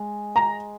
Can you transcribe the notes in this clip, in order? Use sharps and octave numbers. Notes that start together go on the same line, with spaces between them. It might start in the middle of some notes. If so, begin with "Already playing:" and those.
Already playing: G#3
A#5